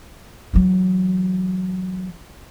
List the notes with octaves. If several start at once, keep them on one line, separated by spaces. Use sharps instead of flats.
E3 F#3